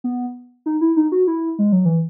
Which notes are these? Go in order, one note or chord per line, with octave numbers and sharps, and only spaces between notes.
B3
D#4
E4
D#4
F#4
E4
G#3
F#3
E3